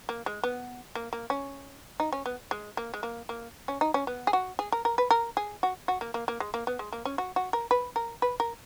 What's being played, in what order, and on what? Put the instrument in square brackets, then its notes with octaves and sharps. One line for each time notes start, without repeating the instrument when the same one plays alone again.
[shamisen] A#3
G#3
B3
A#3
A#3
C#4
D#4
C#4
B3
G#3
A#3
G#3
A#3
A#3
C#4
D#4
C#4
B3
G#4
F#4
G#4
A#4
A#4
B4
A#4
G#4
F#4
F#4
A#3
A#3
A#3
G#3
A#3
B3
G#3
A#3
C#4
F#4
F#4
A#4
B4
A#4
B4
A#4